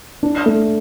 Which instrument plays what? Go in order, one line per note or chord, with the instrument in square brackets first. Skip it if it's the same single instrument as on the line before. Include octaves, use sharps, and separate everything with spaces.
[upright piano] D4
A3